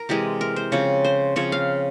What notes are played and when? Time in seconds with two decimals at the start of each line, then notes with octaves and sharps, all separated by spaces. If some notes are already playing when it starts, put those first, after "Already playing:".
Already playing: A#4
0.09 C3 E3 G#3 G4
0.41 A#4
0.56 C5
0.72 C#3 F3 C4 C#5
1.05 C5
1.36 C#3 F3 C4 C#5
1.52 F5